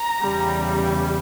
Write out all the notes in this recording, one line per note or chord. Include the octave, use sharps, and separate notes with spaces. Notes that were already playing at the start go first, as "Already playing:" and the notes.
Already playing: A#5
E2 C#3 G3